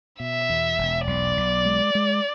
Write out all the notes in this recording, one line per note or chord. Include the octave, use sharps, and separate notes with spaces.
B2 E5
E2
E1
B1 D5
B1
G#3
G#3